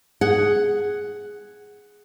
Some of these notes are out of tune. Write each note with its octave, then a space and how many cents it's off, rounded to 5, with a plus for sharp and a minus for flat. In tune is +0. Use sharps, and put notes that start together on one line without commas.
G#4 +0 F#5 +5